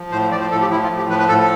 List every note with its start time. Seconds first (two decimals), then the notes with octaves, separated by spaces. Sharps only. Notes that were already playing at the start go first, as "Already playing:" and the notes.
Already playing: F3
0.12 A2 C5
0.32 F3 D5
0.41 C5
0.51 A2 A4
0.61 G4
0.70 F3 E4
0.83 F4
0.91 A2
0.97 G4
1.09 F3 B4
1.19 B4
1.29 A2 A4
1.39 A4